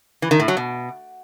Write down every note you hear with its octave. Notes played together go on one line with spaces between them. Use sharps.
E3
D#3
A2
F#3
B2